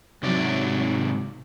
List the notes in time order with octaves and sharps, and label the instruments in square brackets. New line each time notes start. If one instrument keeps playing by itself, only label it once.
[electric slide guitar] G#2 C3 D5 [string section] F#3